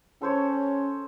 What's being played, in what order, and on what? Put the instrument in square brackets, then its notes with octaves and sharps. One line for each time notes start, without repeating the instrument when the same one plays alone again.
[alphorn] C#4 [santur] A4 C5 C#5